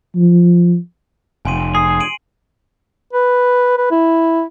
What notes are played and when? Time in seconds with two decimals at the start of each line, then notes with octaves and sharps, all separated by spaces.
0.16 F3
1.45 F1 G#5 C6 D#7
1.75 G#4 C7
2.00 D7 D#7 F#7
3.13 B4
3.78 B4
3.91 E4